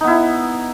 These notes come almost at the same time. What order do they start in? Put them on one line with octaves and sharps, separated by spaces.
D#4 B3 E4